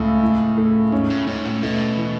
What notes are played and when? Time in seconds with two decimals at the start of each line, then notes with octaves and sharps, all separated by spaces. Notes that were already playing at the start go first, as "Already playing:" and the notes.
Already playing: C#2 A2 A3
0.22 E4
0.57 A3
0.92 G#2 C#4
1.10 A2
1.27 G#2 C#4
1.45 A2
1.62 B2 A3
1.97 E3